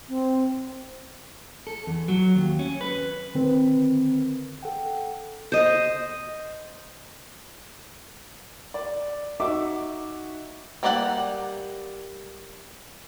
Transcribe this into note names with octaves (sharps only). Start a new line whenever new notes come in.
C4
A4
E2
F#3
D#2
C#4
B4
D3 D#3 C4 A#4 B4
A4 F#5 G5
C5 D#5
D5
D#4 F#4 E5 D6
G3 A#3 G4 D5 F#5